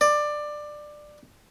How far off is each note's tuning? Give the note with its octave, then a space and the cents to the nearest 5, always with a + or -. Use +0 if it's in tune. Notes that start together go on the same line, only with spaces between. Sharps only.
D5 +15